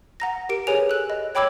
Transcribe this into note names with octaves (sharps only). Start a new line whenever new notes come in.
F#5 A#5 A#6
G4 A#4 D7
G4 G#4 B4 C#5 G#5 F7
A4 F#6
D#5
C#5 G5 B5 D6 E6 G#6